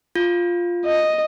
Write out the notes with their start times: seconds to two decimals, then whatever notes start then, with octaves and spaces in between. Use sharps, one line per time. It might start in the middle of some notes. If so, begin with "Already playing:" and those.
0.15 F4
0.85 D#5